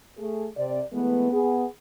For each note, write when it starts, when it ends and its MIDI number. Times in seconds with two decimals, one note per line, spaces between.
0.18 0.46 57
0.18 0.46 68
0.56 0.80 48
0.56 0.80 74
0.92 1.31 52
0.92 1.31 56
0.92 1.31 57
0.92 1.31 59
1.31 1.65 59
1.31 1.65 68